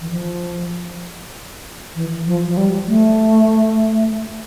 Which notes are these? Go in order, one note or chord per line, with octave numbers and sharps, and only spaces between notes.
E3
F3
E3
F3
F3
G3
A3